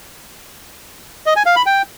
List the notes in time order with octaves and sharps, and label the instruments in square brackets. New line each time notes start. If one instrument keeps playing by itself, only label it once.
[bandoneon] D#5
G#5
F5
B5
G5